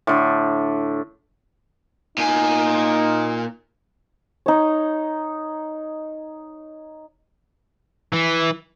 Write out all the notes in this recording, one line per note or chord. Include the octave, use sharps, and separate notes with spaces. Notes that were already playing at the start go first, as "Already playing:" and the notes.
A2 D3
A#2 D#4 G#5
D#4 C#5
E3